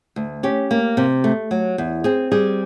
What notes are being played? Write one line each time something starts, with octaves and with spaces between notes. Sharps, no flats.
D2
C#4 G4
A#3
C3
A3
F#3
E2
C4 G#4
G3 G#4